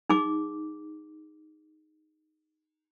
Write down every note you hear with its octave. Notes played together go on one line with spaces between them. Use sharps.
D#4 G#4 D6